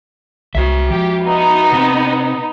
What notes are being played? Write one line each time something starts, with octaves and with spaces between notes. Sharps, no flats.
C2 F#4 E5
F3 G4
B3 D#4
C3 C4